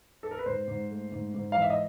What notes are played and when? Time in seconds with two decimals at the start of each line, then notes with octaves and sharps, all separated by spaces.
0.23 A4
0.31 A#4
0.39 B4
0.46 G#2 C5
0.68 G#2
0.90 A3
1.12 G#2
1.34 G#2
1.52 F5
1.56 E3
1.62 E5
1.70 D#5